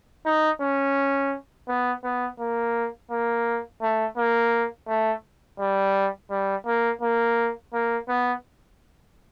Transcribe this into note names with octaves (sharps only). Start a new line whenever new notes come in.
D#4
C#4
B3
B3
A#3
A#3
A3
A#3
A3
G3
G3
A#3
A#3
A#3
B3